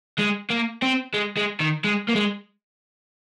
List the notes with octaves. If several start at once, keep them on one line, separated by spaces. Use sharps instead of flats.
G#3
A#3
C4
G#3
G#3
D#3
G#3
A#3
G#3